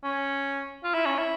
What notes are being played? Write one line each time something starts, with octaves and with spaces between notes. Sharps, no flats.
C#4
F4
E4
C#4
E4